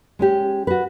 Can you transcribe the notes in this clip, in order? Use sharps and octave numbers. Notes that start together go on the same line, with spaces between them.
G#3 C#4 G4
F#4 B4